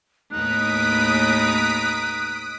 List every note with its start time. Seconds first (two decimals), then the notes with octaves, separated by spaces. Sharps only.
0.31 D#2 A2 B3 D#4 D#6 F#6 B6 D7